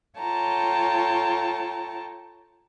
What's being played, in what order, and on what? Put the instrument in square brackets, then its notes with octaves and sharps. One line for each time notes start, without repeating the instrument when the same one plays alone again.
[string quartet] F4 A4 C#5 G5 A5 A#5